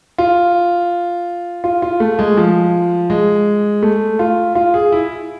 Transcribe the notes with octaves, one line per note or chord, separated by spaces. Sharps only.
F4
F4
F4
A3
G#3
F3
G#3
A3
F4
F4
G#4
E4